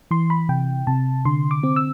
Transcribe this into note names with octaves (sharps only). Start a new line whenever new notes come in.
E3 C6
B5
C3 G5
C3 A5
D3 C6
D6
C4
E6